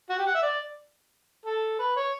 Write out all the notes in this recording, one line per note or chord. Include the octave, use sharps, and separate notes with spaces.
F#4
G4
F#5
E5
D5
A4
B4
C#5